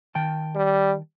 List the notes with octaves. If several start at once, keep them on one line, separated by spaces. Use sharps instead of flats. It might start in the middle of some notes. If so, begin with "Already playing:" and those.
D#3 G5 A5
G3